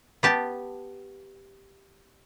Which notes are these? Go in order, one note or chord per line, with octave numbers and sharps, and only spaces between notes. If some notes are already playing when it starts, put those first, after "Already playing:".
B3 G4 A5